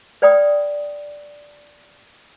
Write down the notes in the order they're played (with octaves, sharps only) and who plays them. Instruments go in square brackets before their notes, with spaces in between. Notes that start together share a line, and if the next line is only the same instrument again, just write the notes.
[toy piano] B4 D5 G5 B5 D#6